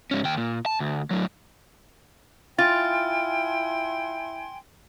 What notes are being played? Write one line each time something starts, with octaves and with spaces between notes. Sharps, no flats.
G#2 C#4
D#2 G5
A#2
A5
D2
A2 F#3
E4 F4 G5 G#5 C6 A6